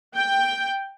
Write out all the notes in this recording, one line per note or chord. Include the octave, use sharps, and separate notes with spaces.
G5